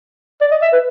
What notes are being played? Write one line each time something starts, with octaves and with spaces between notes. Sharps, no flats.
D5
D#5
E5
B4